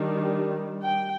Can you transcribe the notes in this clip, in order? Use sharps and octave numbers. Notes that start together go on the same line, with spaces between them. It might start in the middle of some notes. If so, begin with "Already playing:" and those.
Already playing: D#3 G3 D4
G5